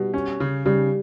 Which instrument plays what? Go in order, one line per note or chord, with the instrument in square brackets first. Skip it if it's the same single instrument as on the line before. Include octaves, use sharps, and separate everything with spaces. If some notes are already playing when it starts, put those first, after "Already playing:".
Already playing: [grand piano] B2 [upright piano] G3
[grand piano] C#4
C#3
[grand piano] C#3 [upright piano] G3